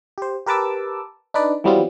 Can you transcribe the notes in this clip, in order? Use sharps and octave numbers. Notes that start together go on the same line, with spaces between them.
G4 C5
G4 A#4 B4 A5 D6 E6
D4 D#4 B4 D5
E3 F#3 G3 B3 C4 F4